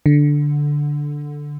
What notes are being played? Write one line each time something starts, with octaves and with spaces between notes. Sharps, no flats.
D3